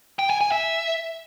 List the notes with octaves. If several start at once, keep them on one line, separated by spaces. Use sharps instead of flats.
G5
G#5
G#5
E5